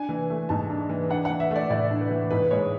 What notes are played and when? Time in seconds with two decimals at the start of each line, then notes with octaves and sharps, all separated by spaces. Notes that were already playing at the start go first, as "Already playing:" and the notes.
Already playing: D4 G#5
0.09 E3
0.30 A3
0.49 G#2 A5
0.70 D4
0.89 E3
1.09 D4 F#5
1.25 E3 F#5
1.40 E5
1.51 A3
1.56 D5
1.70 A2 D5
1.91 D4
2.01 B4
2.10 E3
2.31 G#2 B4
2.51 G#3 C#5